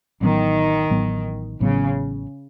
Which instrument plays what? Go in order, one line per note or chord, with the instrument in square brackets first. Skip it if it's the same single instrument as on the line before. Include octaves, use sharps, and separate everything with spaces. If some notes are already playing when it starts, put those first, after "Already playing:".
[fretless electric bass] A1 A2 F#3 B3 [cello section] D#3
[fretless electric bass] A1 A2 F#3 B3
[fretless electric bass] A1 A2 F#3 B3 [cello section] C#3